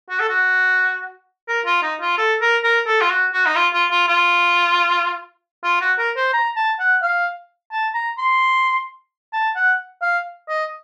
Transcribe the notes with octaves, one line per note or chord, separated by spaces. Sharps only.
F#4
A4
F#4
A#4
F4
D#4
F4
A4
A#4
A#4
A4
F4
F#4
F#4
D#4
F4
F4
F4
F4
F4
F#4
A#4
C5
A#5
A5
F#5
F5
A5
A#5
C6
A5
F#5
F5
D#5